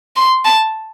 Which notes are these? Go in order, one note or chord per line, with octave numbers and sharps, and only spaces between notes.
C6
A5